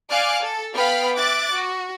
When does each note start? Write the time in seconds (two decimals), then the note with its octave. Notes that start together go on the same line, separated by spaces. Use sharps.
0.10 D5 F5 G#5 D6 F6 F#6
0.42 A4
0.75 B3 F5 G5 B5 F6
1.17 E5 D6 F#6 A6
1.52 F#4